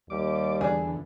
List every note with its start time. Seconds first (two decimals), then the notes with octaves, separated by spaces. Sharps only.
0.10 D#2 G3 D6
0.61 E2 D3 G#4 B4 D5